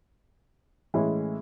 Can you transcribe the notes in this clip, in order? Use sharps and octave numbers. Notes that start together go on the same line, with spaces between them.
A2 E3 G#3 C#4 E4